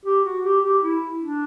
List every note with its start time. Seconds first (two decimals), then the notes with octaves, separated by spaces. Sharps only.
0.05 G4
0.25 F#4
0.44 G4
0.64 G4
0.83 E4
1.23 D4